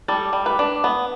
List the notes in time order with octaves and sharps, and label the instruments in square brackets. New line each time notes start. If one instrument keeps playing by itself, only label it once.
[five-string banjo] G3 A4
G3
B4
D4
B3